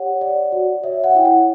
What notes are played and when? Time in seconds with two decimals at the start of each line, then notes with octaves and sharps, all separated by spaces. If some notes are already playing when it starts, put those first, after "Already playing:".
Already playing: G4 C#5 F#5
0.21 D5
0.52 F#4
0.83 C#5 E5
1.04 F#5
1.15 E4 G5
1.25 F#5